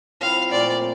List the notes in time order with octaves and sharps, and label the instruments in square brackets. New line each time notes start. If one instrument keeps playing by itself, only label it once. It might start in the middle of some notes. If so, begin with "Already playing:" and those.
[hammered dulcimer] F3 C4 E4 [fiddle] F5
[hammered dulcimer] A#2 A3 C4 F4 [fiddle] D5